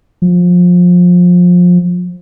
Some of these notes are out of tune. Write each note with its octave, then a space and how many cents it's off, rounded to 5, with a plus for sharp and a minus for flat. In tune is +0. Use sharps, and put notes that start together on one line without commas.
F3 +25